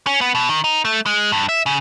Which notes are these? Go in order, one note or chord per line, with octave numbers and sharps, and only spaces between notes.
C#4
B3
B2
D#3
D#4
A3
G#3
G2
E5
C#3